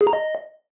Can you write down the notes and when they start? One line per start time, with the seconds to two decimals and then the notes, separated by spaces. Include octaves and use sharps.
0.01 G#4
0.07 A#5
0.13 D#5